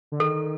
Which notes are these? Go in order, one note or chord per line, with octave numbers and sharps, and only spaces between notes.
D3
D#3 A4